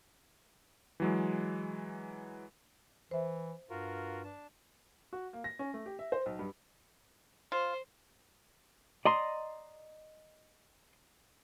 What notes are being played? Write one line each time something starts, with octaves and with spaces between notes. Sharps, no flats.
E3 F#3 G#3
E3 C5 E5
G2 F4 F#4 A#4
D4 A5
F#4
A#3
A#6
C#4
A3
G4
E5
C5
B1
G2
F4 C5
D5 D#5 A#5 C6